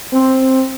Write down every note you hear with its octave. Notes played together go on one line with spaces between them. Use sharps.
C4